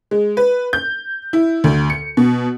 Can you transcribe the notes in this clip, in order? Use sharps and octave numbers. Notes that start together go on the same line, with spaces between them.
G#3
B4
G6
E4
D2
C#7
B2